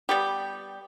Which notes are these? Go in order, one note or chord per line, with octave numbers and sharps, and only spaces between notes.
G3 B3 G4